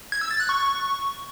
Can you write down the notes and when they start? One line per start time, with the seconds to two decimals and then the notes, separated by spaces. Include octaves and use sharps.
0.12 G#6
0.21 E6
0.31 A6
0.40 F#6
0.49 C#6